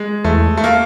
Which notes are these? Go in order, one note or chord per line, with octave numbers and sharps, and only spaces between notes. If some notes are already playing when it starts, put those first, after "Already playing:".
Already playing: G#3
E2 A3
A3
A#3